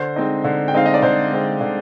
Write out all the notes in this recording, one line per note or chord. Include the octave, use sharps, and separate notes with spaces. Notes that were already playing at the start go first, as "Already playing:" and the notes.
Already playing: D3 C5
G#3 C4 D#4
D3
G5
G#3 C4 D#4 F5
D#5
D5
D3 C5
G#3 C4 D#4
D3